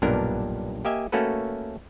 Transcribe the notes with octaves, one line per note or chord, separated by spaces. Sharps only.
B1 G2 A#2 B3 D4 A#4
A#3 G4 D#5 E5 G#5
A3 A#3 C#4 F#4 A4 B4